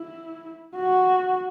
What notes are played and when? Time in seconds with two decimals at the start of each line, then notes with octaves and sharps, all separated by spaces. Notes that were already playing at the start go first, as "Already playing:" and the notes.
Already playing: E4
0.76 F#4